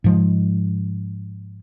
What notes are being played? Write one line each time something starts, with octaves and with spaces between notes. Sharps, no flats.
G#2 F3 G#3